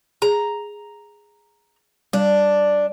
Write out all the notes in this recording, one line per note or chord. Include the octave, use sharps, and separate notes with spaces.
G#4 A#5
G3 D4